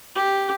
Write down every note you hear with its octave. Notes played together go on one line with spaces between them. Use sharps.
G4